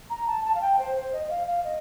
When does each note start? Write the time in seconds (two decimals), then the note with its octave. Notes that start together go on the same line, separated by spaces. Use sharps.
0.10 A#5
0.27 A5
0.44 A5
0.55 F5
0.61 G5
0.79 C5
0.96 C5
1.13 D#5
1.24 D#5
1.30 F5
1.47 F5
1.64 D#5